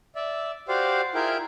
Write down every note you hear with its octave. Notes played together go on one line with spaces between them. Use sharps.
D5 E5
F#4 G4 C5 D5 F5
E4 F4 G#4 A#4 G5